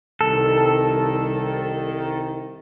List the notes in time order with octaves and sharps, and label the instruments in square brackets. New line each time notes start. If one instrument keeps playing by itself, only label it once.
[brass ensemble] C2 D#3 [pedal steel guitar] A4